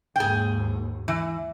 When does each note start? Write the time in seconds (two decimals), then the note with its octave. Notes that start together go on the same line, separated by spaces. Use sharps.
0.16 D#2 G#2 G#4 G5
1.08 E3